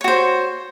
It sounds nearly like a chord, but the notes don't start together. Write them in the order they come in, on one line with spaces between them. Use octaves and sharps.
C#5 F#4 C5